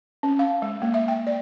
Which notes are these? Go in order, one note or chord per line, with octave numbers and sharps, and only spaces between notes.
C#4
F5
G#3
A#3
E5
G5
D5